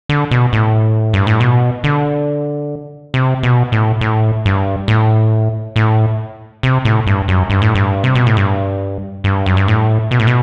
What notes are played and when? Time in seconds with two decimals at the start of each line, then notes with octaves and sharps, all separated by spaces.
0.09 D3
0.31 B2
0.53 A2
1.14 G2
1.27 A2
1.40 B2
1.84 D3
3.14 C3
3.43 B2
3.72 A2
4.01 A2
4.45 G2
4.88 A2
5.76 A2
6.63 C3
6.85 A2
7.07 G2
7.28 F#2
7.50 G2
7.62 A2
7.75 G2
8.04 C3
8.15 B2
8.26 A2
8.37 G2
9.24 G2
9.46 F#2
9.57 G2
9.68 A2
10.11 B2
10.19 A2
10.27 B2